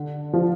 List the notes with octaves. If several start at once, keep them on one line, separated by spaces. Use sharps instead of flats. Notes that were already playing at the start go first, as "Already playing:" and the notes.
Already playing: D3
F3